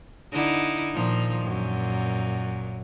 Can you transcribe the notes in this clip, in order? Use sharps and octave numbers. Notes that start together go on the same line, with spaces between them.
D3 D#4 E4
A#2 D#3 F3
F#2 A#2